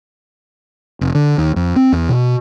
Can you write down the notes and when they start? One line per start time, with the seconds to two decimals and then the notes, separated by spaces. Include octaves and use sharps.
1.01 F1
1.15 D3
1.38 D#2
1.56 F2
1.76 C4
1.92 E2
2.09 B2